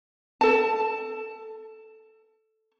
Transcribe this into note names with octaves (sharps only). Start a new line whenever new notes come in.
A4 A5